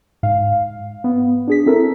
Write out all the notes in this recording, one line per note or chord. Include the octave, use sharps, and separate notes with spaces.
G#2 F5
B3
D4 G#4 B6
C4 E4 A4 A#4